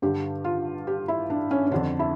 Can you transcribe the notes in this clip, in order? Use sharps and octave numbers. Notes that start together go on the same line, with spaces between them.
G2 D3 G4
F4
G4
E4
D4
C#4
C#4
F2 D3 D4
E4